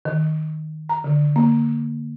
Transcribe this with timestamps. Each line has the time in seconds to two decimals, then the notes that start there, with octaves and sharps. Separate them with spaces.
0.05 D#3
0.89 A#5
1.04 D3
1.36 A#3